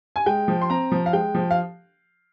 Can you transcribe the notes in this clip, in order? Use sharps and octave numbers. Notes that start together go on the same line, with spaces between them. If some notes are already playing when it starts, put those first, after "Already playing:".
G#5
G#3 G5
F3
C6
C4 A#5
F3
F5
G#3 G5
F3
F5